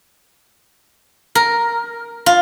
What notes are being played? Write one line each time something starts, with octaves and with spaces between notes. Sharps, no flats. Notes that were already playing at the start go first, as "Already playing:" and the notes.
A#4
F4